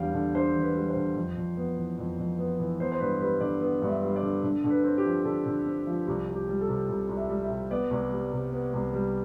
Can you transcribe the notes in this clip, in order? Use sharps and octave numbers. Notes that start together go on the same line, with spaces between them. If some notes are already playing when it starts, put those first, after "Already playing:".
Already playing: E2 G3 D4 F5 G5
D3
D4 C5
E2
B4
G3
C5
D3
F2
F2
B3
E3
F2
F2
B3
E3
B3 C5
C5
G2 B4
G3 B4
D3 D5
B3
G2
E5
G3
D5
D3
D3
D3
B4
C4
G4
F3
D3 A4
D3
C4
F3
C2 G4
C2
G4
G3
A4
C3
C2
C2
E5
G3
E5
C3
B3 D5
C2
G3
C3
B3
C2
G3